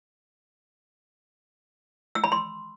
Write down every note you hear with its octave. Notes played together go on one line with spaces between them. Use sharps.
E6
B5
C6